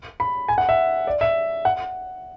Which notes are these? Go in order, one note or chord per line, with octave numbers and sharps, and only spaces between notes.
B5
G#5
F#5
E5
D5
E5
F#5